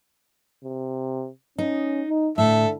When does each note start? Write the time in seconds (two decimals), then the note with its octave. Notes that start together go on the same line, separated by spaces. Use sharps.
0.64 C3
1.58 C#4 D#4
2.09 D#4
2.38 A2 D3 A4 E5